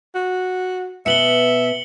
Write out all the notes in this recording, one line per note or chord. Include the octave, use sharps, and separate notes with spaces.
F#4
B2 B3 E5 C#7 F#7 G7